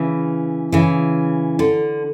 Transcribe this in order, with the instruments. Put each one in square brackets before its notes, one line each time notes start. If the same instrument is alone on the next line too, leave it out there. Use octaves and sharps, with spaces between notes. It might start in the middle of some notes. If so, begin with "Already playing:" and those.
Already playing: [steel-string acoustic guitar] C#3 E3
C#3 E3
D3